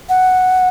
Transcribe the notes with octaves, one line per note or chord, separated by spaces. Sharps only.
F#5